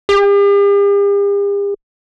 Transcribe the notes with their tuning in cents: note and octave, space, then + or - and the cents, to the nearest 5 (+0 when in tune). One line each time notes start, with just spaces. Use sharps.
G4 +45